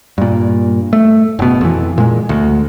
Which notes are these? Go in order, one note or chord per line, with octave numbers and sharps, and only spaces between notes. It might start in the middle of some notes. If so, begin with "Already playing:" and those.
G2 A#2
A3
F#1 B2
F2 E3
A#2 G#3
D2